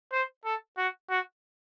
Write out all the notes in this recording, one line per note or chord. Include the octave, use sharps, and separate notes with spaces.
C5
A4
F#4
F#4